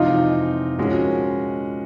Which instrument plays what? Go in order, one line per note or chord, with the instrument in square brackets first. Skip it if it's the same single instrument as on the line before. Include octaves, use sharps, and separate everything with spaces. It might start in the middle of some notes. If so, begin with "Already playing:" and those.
Already playing: [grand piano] F2 C3 E3 G#3 [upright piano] D#4 F4
[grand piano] A#2 F3 G#3 C#4 F#4